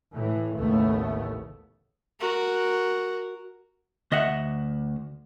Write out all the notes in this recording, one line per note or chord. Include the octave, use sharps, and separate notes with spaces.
A2 E3
A1 D#2 C#3 A3 B3
F#4 A#4
D2 D#5 E5 F#5